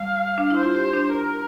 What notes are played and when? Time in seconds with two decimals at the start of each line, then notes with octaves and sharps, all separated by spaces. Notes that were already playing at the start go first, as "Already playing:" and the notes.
Already playing: G3 F5
0.38 D4
0.50 E4
0.57 C5
0.63 F4
0.75 G4
0.93 D4
1.12 A#4